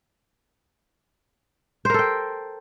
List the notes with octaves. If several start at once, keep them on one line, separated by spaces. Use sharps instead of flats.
A4 A#4 C5 G5